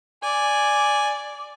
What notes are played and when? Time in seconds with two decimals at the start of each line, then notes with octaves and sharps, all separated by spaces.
0.23 D5 G#5